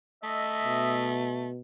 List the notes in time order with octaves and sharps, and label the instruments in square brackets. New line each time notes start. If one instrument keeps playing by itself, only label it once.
[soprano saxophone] A3 [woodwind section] D#5 E5
[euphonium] B2